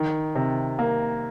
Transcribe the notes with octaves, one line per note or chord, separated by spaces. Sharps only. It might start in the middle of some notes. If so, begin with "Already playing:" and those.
Already playing: D#3
C3
A#3